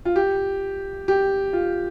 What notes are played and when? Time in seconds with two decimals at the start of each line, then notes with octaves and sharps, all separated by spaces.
0.05 F4
0.16 G4
1.08 G4
1.53 F4